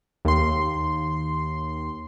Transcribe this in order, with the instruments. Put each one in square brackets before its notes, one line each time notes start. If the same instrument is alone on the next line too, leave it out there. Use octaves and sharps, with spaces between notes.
[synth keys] D#2 C6